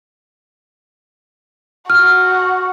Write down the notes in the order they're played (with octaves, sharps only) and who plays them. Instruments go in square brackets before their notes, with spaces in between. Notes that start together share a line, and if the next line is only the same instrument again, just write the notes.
[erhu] F#4 [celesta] F6